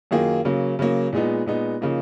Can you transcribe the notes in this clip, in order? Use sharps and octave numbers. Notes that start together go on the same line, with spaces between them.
F#2 D#3 A#3 F4 G#4
C#3 F#3 A#3
C#3 F#3 A#3
A#2 G#3 B3 D#4
A#2 G#3 B3 D#4
C#3 F3 A#3 D#4